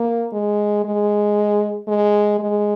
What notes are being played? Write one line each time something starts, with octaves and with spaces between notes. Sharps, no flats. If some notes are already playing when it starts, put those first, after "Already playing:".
Already playing: A#3
G#3
G#3
G#3
G#3